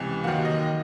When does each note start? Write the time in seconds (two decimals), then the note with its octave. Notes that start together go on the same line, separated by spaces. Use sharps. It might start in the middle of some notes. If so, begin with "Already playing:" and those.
Already playing: C#2 C3 E3
0.23 D#2 D#3 F#3 A#3 F#5
0.45 D#5
0.67 D#3